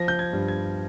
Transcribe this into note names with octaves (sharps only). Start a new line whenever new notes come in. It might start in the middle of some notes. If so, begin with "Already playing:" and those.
Already playing: F3 A#6
G6
G#6
G2
G#6